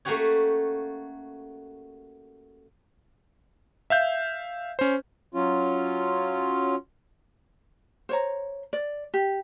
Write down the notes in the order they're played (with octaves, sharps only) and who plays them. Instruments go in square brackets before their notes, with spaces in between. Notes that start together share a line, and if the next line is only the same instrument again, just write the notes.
[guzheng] A3 A#3 C#4 F#4 G4 C#5
[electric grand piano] E5 F5 G6
C#4 C5
[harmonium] F#3 C#4 F4
[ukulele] C5 C#5 A#5
D5
G4